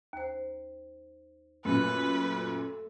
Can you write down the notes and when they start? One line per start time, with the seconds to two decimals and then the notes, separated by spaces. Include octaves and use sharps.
0.13 D#2 C5
1.65 F#2 A#2 A3 B4